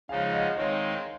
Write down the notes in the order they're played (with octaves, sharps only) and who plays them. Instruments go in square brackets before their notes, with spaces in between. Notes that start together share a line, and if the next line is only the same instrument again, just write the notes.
[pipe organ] C#3 F3 G#3 D#4 [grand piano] F5 G#5
[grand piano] D#5 F#5
[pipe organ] D#3 G#3 C4 D#4 [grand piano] C#5 F5